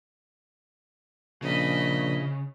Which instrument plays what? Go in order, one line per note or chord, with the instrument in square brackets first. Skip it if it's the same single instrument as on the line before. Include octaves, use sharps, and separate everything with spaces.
[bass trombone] A#1 [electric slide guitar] C#3 [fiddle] D#5 B5